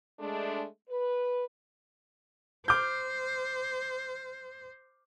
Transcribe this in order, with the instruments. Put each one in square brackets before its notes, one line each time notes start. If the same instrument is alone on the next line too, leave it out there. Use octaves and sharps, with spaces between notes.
[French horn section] G#3 A3 D4
B4
[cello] C5 [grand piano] D6 F6 G6